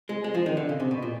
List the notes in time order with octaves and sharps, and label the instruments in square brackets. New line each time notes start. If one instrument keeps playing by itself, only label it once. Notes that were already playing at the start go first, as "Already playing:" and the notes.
[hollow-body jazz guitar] G#3
G#3
F3
D#3
D3
C#3
C3
B2
A#2